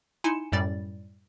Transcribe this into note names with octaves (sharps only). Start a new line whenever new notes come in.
D#4 E4 G#5 C6 C#7 E7
F#2 A2 G3 D5 A6